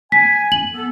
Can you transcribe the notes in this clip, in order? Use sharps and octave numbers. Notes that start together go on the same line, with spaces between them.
G#5 B6
F#7
B3 A4